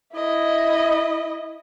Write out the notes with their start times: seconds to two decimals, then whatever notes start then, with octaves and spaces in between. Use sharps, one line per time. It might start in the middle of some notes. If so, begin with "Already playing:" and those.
0.14 E4 D#5